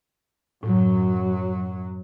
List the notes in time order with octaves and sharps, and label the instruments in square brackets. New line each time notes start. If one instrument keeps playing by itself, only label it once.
[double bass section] F#2 F#3 [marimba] A2